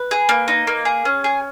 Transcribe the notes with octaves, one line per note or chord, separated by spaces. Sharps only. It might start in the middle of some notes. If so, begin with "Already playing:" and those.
Already playing: B4
G#4
A#3
D#4
A#3
G#4
C#4
G#4